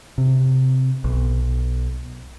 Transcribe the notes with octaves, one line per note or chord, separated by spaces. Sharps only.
C3
B1